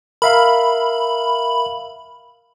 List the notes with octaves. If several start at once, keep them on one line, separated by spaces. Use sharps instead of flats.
A#4 E5 F5 B5